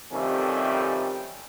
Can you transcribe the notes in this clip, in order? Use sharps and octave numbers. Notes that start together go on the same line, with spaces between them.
F2 C3 D#3 G3 A3 C#4